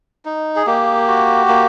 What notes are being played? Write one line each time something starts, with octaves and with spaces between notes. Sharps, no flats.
D#4
G#4
A#3 G4
F#4
A#3